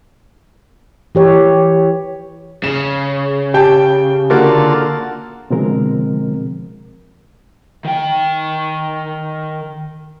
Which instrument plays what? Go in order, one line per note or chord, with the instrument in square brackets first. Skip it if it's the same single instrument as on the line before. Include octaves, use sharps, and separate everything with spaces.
[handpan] E3 G4 C#5
[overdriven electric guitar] C#3 [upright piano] E7
[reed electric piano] G4 [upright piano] G5 A5 G6
[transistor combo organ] D3 F4 A4 [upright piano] A#3 F#4
[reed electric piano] B2 D3 F3 G#3 C4 A#4
[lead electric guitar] D#3 G5